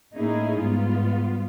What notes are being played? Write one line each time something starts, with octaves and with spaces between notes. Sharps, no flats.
A2 A#3 C#4 D#4 E4 G#4
G#2 G3 B3 F4